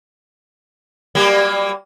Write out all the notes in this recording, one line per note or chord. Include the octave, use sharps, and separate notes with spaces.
F#3 G3 A#3